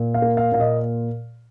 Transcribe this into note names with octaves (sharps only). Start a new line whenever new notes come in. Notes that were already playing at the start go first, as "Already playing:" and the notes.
Already playing: A#2
F5
A#3
F5
A#2 F5
D#5